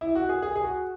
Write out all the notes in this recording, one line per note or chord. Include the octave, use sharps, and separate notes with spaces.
E4
F#4
G#4
G#4
G#4
F#4